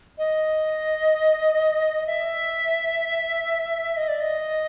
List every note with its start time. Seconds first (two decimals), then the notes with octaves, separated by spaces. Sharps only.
0.18 D#5
2.07 E5
3.97 D#5
4.08 D5
4.20 D#5